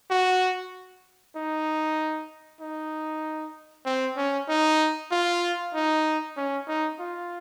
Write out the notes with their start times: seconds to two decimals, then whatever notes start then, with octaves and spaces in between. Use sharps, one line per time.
0.11 F#4
1.36 D#4
2.61 D#4
3.86 C4
4.17 C#4
4.49 D#4
5.11 F4
5.74 D#4
6.37 C#4
6.67 D#4
6.99 F4